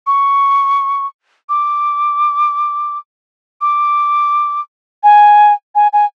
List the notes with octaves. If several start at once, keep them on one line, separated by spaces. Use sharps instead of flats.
C#6
D6
D6
G#5
G#5
G#5